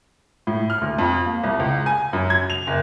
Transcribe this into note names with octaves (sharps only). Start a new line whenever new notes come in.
A2
F6
D2
F2
A#3
C2
C#2
G#5
F#2
G#6
F7
F#1